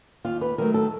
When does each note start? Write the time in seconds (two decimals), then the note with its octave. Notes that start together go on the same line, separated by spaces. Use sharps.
0.24 D#2 F4
0.41 B4
0.58 D#3 F#3 A3 A#4
0.74 A4